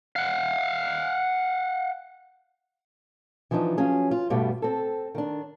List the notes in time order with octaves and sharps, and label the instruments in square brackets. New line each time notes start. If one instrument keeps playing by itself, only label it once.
[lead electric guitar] F5 F#5
[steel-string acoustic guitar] E3 F3 B3 D4 D#4
F3 F#3 C#4 G#4
F4
G2 B2 G3 A3
C4 A4
D#3 D4